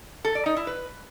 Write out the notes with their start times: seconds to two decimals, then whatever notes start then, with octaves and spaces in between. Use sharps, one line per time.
0.25 A4
0.35 D5
0.46 D#4
0.56 E4
0.67 B4